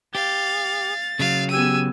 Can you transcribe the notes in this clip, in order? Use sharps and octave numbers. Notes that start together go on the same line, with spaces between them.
G4 F5 A6
C#3 F#3 F5
B3 G4 G#5 E6 D#7